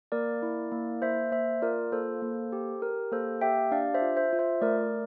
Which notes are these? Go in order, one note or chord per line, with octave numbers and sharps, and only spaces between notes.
A#3 A#4 D5
E4
A#3
A#3 C5 E5
A#3 C5 E5
F4 A#4 D5
A#3 A4 C5
A#3
G4
G4 A#4
A#3 A4 C5
G4 E5 G5
D4 D5 F5
C5 E5
F4
C5 E5
F4
C5 E5
A3 A#4 D5